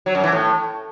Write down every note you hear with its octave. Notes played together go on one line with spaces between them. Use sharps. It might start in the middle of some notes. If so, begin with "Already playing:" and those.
F#3
F#2
E3
A2